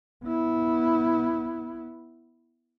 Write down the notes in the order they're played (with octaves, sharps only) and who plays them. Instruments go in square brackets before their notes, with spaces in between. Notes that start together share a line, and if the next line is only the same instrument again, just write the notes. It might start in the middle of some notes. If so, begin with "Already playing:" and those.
[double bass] B3 E4